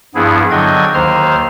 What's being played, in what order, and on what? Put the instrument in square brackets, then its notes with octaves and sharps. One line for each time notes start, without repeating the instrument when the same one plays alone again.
[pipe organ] G2 F3 B3 E4 G#4
D3 F#3 D#5 G5 G#6
D#2 D#3 C5 F6